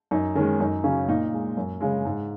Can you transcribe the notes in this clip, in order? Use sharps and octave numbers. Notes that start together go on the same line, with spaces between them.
F#2 D#4
D#3 G#3 C#4
F#2 D#4
C#3 F#3 C#4
A#2 D#4
G#3
F#2
C#3 G#3
G#2